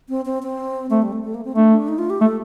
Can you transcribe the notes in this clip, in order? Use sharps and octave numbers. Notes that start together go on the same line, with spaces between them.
C4
C4
C4
A3 C4
G3
A3
A3
A#3
C4
A3 D4
D4
D#4
F4
G4
A3 A4